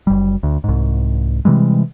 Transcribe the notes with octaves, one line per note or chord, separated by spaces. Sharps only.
F#1 G3
D2
C2 G#2
C3 E3 G3 G#3